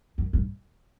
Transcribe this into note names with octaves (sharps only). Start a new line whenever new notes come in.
F#2
G2